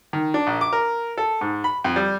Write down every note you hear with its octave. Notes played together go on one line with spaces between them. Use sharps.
D#3
D4
A#1
D6
A#4
A4
G#2
B5
F2
G3